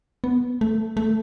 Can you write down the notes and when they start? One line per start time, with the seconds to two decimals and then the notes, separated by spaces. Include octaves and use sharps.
0.24 B3
0.61 A3
0.97 A3